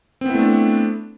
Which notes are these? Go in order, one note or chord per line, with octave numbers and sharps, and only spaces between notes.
A3 B3 C4 D4 E4